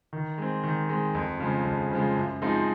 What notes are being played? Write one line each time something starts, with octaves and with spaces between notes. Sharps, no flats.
D#3
G#3 C4
D#3
G#3 C4
F2
C#3 F3 G#3
F2
C#3 F3 G#3
F#2
F3 G#3 C4 D#4